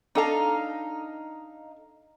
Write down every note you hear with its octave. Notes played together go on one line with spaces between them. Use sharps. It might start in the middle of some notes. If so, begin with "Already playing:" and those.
D4 D#4 A4 F5 A5